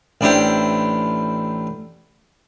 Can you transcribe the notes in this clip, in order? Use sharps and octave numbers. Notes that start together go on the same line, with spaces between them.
A1 D4 E4 G4 C5